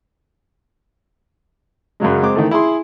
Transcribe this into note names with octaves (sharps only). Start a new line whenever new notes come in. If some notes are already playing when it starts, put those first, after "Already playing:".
F#2 C#3 F#3 G#3
G#3 C4 D6
D#3 E3 A3
E4 G#4 C6